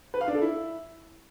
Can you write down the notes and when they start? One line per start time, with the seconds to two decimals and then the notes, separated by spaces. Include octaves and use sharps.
0.14 B4
0.21 F5
0.28 D4
0.35 A4
0.42 E4